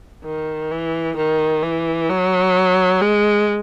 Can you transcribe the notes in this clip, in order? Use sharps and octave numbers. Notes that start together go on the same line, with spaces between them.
D#3
E3
D#3
E3
F#3
G#3